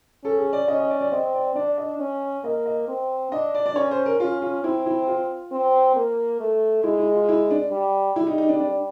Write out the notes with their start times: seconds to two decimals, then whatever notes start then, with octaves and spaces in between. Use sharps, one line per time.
0.24 C#4 A4
0.38 G#4
0.53 D5
0.68 C#4 D#5
0.79 D#5
0.90 D5
1.01 D5
1.12 C4 D#5
1.34 D5
1.56 D4 D5
1.78 D#5
1.99 C#4
2.44 A#3 D#5
2.66 D#5
2.88 C4
3.32 D4 D#5
3.55 D5
3.66 D5
3.76 C#4 C#5
3.91 C5
4.06 A#4
4.20 C#4 F4
4.42 F4
4.64 C4 E4
4.86 E4
5.07 F4
5.52 C4
5.96 A#3
6.40 A3
6.84 G#3 E4
6.99 E4
7.14 F4
7.29 E4
7.51 D4
7.71 G3
8.16 G3 E4
8.27 D#4
8.38 D#4
8.49 D4
8.60 D4